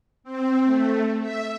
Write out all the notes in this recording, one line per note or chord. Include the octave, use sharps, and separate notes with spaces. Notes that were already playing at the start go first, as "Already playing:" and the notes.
C4
A3
E5